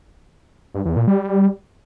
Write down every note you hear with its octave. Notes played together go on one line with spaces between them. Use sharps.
G2
E2
A#2
G3